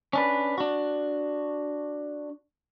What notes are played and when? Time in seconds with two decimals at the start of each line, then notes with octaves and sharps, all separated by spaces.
0.13 C#4 D4 B4
0.58 D4 F#4